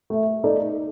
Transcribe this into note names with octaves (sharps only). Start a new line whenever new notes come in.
A3
D#4 A4 D5